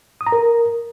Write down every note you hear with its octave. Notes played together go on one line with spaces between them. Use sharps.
D#6
A#5
A#4